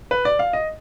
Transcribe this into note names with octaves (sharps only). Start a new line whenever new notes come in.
B4
D5
F5
D#5